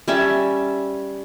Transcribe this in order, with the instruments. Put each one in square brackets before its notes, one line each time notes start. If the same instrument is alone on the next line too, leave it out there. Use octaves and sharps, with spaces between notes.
[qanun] G3 C#4 E5 A5